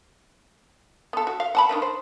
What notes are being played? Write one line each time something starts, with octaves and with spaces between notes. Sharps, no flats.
B3 A4
F#4
F5
F#5 A5 B5
D#3 D4 B4
C5